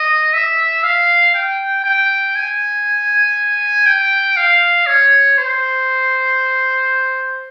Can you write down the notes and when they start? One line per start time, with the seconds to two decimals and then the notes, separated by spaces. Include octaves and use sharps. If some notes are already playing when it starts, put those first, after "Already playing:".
Already playing: D#5
0.33 E5
0.84 F5
1.34 G5
1.84 G5
2.36 G#5
3.86 G5
4.36 F5
4.87 C#5
5.38 C5